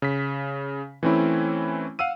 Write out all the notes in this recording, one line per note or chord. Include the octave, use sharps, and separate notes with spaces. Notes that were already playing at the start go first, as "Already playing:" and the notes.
C#3 B6
E3 A3 C4 C#4 E4
F5 F#5 E6 D#7